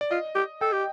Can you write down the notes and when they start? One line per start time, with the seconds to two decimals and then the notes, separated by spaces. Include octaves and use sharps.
0.01 D5
0.11 F4 D#5
0.35 G4
0.61 A4 G5
0.72 G4